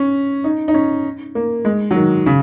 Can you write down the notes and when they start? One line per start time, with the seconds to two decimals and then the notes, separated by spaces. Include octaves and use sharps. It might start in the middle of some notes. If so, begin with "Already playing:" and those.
Already playing: C#4
0.44 D#4
0.68 D#4
0.74 C#4
1.35 A#3
1.65 G#3
1.91 F#3
1.96 D#3
2.26 C#3